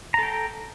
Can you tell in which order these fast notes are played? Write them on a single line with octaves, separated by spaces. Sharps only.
A#5 A4 G5